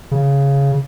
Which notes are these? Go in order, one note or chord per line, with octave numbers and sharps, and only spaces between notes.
C#3